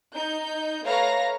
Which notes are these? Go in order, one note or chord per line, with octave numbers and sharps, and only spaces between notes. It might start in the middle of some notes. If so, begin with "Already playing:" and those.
D#4 G6
A3 B4 C#5 F5 A#5 A#6